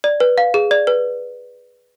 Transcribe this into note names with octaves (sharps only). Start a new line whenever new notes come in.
D5
B4
F5
G#4
D5
B4